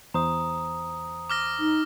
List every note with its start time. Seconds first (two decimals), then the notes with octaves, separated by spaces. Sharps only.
0.14 E2 C5 A#5 D#6
1.30 D6 F6 A#6
1.59 D#4